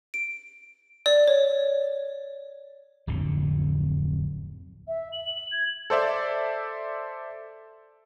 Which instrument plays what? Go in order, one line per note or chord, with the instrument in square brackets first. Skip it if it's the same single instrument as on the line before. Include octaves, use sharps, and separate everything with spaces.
[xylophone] D7
D5
C#5
[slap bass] D1 F2 D3
[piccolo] E5
F#7
G#6
[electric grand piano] A4 C5 D5 E5